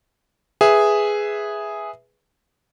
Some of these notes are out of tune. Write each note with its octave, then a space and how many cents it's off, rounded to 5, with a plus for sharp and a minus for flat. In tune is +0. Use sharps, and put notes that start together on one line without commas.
G#4 +0 B4 +0 E5 +0